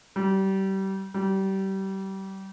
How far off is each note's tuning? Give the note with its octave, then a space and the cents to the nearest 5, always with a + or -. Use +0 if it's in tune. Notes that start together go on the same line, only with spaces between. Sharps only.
G3 -30
G3 -30